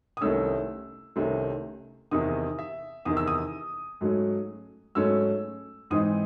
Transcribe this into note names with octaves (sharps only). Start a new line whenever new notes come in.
D#6
C2 C3 D#3 A3 C#4 E6
C2 C3 D#3 A3 C#4
E2 C3 D#3 D#6
E5
E2 C3 D#3 D#6
E6
D#6
G#2 F#3 A3 C#4
G#2 F#3 A3 C#4 E6
G#2 E3 C4 D#4 D#6